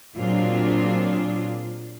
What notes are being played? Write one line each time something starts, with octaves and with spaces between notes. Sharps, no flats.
A#2 F#3 C4 D4 F4 G#4